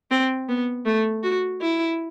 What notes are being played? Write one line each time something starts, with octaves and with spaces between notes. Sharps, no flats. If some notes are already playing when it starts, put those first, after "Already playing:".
C4
B3
A3
F#4
E4